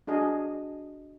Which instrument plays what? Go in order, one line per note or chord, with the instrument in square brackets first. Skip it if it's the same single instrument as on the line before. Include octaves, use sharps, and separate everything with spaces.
[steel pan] D4 F#4 G#4 D#5